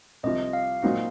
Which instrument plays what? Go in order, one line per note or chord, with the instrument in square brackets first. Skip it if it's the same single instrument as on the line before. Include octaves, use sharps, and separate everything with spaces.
[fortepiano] C2 C3 F3 [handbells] D#5
[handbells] F5
[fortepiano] A#2 F#3 C4 D#4 F#4